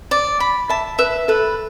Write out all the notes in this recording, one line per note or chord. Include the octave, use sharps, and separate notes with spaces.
D5
B5
E5 A5
B4 E5
A4 B4